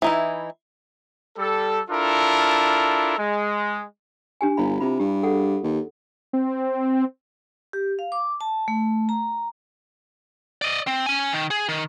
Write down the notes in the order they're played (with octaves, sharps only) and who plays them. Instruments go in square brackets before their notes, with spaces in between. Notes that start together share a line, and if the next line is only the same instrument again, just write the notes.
[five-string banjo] E3 D#4 E4
[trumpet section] G3 A4
D4 E4 F4 A4 A#4
G#3
[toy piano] D4 G4 G#5
[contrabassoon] G1 [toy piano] E4 F5 B5
[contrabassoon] C3 [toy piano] E4 F4 B5
[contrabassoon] G2 [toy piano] G4
[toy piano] G#4 A4 F#5
[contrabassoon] D#2
[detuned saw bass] C4
[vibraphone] G4
F5
D6
A5
A3
A#5
[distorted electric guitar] D5 D#5
C4
C#4 G#5
D#3
G#4
D#3